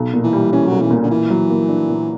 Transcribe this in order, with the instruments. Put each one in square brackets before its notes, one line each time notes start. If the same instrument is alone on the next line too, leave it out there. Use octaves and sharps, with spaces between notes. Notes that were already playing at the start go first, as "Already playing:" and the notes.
Already playing: [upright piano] B1
A#2
[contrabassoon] E3
[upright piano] G3
[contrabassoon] E3 [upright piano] C#4
[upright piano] B1 [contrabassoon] F#3
[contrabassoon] E3
[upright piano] A#2
[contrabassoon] D3
[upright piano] A#2 [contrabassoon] E3
[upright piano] F#3
A#3
D4
A#2